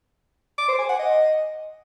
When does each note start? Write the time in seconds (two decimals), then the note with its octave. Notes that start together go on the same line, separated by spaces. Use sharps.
0.58 D6
0.68 C5
0.79 G#5
0.89 F#5
0.99 D#5